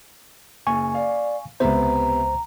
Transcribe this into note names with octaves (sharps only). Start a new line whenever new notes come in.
F#1 G#5 C#6
D5 F5
C#2 C3 B3 C5 E5 A#5